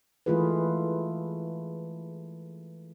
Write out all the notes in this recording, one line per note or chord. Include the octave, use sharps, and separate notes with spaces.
E3 G#3 A3 F4 G#4 B4